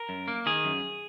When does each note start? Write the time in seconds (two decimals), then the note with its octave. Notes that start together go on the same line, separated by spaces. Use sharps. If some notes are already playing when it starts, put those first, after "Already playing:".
Already playing: A#4
0.09 F#2
0.28 A#3
0.46 D#3 G#4
0.65 F#2